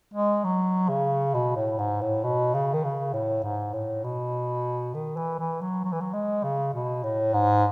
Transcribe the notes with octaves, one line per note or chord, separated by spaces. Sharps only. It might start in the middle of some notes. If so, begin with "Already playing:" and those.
G#3
F#3
C#3
B2
A2
G#2
A2
B2
C#3
D#3
C#3
A2
G#2
A2
B2
D#3
E3
E3
F#3
F#3
E3
F#3
G#3
C#3
B2
A2
G#2